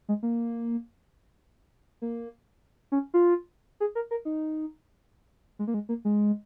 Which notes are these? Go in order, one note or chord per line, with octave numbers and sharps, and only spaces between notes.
G#3
A#3
A#3
C#4
F4
G#4
A#4
A#4
D#4
G#3
A#3
G#3
A#3
G#3